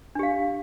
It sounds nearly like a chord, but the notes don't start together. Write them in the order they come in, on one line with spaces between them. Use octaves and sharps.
D4 G4 F5